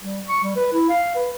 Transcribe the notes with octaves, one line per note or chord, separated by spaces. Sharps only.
G3
C#6
G3
B4
E4
F5
B4